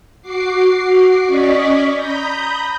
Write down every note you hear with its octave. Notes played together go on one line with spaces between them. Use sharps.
F#4 D6 C7
C#4 D5 D#5 C#6 B6
A#5 B5 D#6 G6 A#6